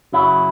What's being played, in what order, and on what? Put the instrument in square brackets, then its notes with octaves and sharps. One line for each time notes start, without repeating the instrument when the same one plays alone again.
[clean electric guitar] F#2 C#3 F#3 E4